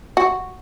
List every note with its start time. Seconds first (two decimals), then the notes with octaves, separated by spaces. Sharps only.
0.17 F#4